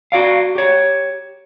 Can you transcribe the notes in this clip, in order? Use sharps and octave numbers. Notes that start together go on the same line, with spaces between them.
F#4 D5 F5
G4 C#5